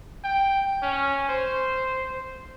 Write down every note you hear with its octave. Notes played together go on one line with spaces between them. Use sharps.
G5
C#4
C5